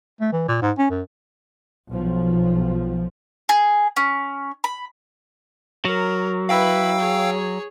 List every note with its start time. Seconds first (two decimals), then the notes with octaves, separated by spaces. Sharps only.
0.21 A3
0.32 E3
0.48 A#2
0.62 G#2
0.78 C#4
0.90 F#2
1.93 B1 F3
3.49 G#4
3.96 C#4
4.64 B5
5.85 F#3 A#4
6.49 E4 B4 F5 G5 E6
7.00 G#4 C#5